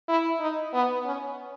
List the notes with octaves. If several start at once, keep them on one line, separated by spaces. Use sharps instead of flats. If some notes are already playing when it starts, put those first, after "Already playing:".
E4
D#4
B3
C#4